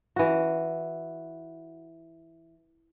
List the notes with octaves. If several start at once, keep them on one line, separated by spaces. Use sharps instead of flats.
E3 F#4